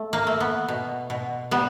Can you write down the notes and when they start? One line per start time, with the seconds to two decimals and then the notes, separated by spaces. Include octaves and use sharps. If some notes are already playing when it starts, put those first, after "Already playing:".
Already playing: A3
0.13 A#3
0.27 A3
0.40 B3
0.68 B2
1.10 B2
1.51 G3 B3